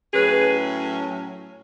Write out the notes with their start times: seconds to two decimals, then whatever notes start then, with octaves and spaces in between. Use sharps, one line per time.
0.13 A2 F#3 C#4 G#4 B4